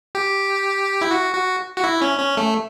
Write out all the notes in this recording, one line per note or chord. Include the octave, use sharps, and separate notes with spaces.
G4
E4
F#4
F#4
F#4
E4
C#4
C#4
A3